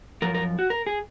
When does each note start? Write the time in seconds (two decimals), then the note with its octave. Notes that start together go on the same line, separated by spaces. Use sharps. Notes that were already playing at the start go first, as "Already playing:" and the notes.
0.22 F#2 F3 A#4
0.34 A#4
0.59 F#4
0.70 A#4
0.87 G#4